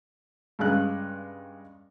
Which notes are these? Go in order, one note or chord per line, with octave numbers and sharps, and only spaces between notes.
G2 C#3 G#3 F5 F#6